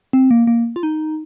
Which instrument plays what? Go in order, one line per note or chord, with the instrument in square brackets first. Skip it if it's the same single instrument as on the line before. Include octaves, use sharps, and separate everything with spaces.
[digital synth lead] C4
A#3
A#3
F4
D#4